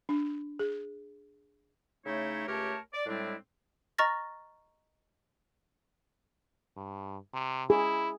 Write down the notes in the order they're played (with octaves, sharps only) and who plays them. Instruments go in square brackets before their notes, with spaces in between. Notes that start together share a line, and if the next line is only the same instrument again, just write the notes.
[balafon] D4
G#4
[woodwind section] C#3 A3 D#4 E4 C#5
C#2 A3 G4 A#4 C#5 A5
D5
A2 G3 G#3 C4 D4 E4
[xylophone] D#5 A#5 C#6 F6 A6 A#6
[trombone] G2
C3
[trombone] E4 [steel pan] G#4